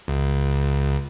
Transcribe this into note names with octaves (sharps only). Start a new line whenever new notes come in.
C#2